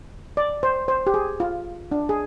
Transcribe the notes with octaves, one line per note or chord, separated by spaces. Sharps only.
D5
C5
C5
G4
G#4
F4
D4
G#4